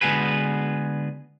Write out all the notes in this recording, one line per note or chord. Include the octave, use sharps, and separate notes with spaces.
D3 G#3 B3 F#4 G#4 B4